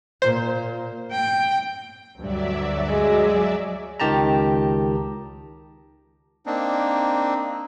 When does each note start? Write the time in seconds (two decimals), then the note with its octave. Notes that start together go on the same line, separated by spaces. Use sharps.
0.22 A#2 C5
1.12 G5
2.18 D2 G2 F#3 D5 E5
2.89 G#3
4.00 C#2 D#3 G4 A5 A#5
6.46 A#3 C4 D4 D#4